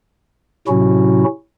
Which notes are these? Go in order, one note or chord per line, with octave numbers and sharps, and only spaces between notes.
A2 C3 F#3 C#4 E4 F#4